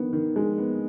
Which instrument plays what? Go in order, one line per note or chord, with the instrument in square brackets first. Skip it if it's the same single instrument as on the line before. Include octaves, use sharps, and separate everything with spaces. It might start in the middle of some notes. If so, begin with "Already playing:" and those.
Already playing: [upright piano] D#3 B3 D4
D#3
G#3
B3